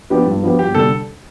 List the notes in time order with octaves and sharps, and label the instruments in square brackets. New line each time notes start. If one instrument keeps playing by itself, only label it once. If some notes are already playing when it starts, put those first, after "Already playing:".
[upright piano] F3 B3 D4 G4
G2
F3 B3 D4 G4
[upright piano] G1 [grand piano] G4
[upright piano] D3 G3 D4 [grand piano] A4